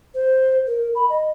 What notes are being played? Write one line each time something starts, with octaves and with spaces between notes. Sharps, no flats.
C5
A#4
B5
D#5